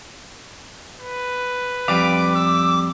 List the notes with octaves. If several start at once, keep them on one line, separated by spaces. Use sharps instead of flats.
B4
F2 G3 F5 D6
E6